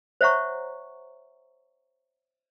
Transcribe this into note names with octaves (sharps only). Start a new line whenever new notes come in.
C5 C#5 E5 F#5 A#5 C#6